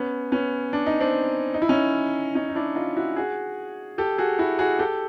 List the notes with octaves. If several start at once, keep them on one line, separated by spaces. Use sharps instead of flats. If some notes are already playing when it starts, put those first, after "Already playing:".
Already playing: B3 C#4
B3 C#4
D4
D#4
C4 D4
D#4
E4
C#4 D#4
C#4 D#4
D#4
D4 E4
D#4 F4
E4 F#4
F#4 G#4
G4 A4
F#4 G#4
E4 F#4
F#4 G#4
G4 A4